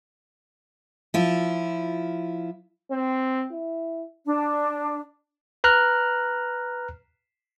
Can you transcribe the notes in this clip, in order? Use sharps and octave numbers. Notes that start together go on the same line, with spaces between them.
F3 E4 F4
C4
E4
D4
B4 A#5 F6 F#6